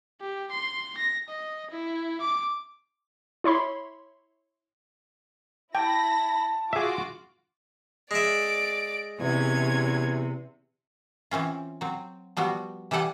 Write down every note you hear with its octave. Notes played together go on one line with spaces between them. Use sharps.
G4
C6
A#6
D#5
E4
D6
E4 C#5 B5 C6
E4 G5 A5 B5 A#6
F4 F#4 G#4 E5 D6
G#3 D5 E5 D7
E2 C3 C#4 G#6
E3 C4 C#4 F4
F#3 C4
F3 G3 B3 F#4
E3 G3 G4 A4 F#5 G#5